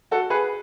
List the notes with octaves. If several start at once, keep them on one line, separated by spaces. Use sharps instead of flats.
F#4 A4
G#4 B4